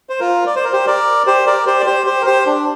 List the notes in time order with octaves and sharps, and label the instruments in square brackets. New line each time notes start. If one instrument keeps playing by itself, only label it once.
[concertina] C5
F4 A#4
D5
C5
A#4
G4 C5
A#4 D5
G4 C5
A#4 D5
G4 C5
D5
G4 C5
G4 C5
A#4
G4 C5
D4